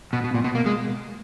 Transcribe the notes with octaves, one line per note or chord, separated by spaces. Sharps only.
B2
B2
A#2
B2
A#3
G#3